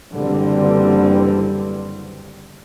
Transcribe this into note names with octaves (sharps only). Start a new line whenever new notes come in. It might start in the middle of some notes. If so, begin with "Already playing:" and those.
F#1 D3 E3 G3 C4